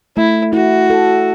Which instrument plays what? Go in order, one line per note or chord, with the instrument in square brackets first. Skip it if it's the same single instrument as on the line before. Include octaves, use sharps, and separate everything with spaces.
[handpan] A3 [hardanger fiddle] E4
[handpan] E4 [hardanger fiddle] F#4
[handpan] A4